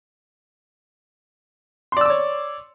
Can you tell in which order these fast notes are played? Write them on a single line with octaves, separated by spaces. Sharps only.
C6 D5 E6 D6 C#5